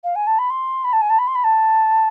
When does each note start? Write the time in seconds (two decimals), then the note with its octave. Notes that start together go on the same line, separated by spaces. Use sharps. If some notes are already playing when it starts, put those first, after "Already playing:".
0.04 F5
0.16 G#5
0.27 A5
0.39 B5
0.50 C6
0.84 B5
0.93 A5
1.02 G#5
1.10 A5
1.19 B5
1.27 C6
1.35 B5
1.44 A5